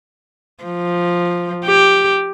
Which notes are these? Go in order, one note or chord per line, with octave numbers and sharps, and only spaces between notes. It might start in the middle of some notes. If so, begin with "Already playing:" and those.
F3
G4